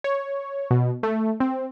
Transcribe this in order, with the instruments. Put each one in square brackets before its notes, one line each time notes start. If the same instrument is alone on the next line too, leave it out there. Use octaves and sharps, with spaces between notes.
[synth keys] C#5
B2
A3
C4